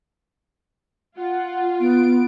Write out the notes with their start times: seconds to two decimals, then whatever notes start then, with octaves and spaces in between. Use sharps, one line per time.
1.17 F4 F#5
1.80 B3 D7